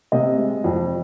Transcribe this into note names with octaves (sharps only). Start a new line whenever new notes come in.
C3 D#5
G#3
F2